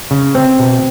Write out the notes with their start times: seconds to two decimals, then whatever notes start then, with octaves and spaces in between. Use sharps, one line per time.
0.11 C#3
0.35 C4
0.59 B2